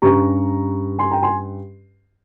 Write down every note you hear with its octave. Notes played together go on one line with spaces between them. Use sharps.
G2 G3 C#4 A#5 C#6
G#5 C6
G5 A#5
G#5 C6